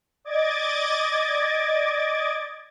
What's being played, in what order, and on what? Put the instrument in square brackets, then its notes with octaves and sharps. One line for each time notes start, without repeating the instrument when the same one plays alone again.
[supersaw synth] D5 D#5 D6 G#6 A6